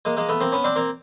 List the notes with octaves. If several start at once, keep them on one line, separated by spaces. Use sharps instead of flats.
G#3 A#3
G#3 A#3
A3 B3
A#3 C4
B3 C#4
C4 D4
A#3 C4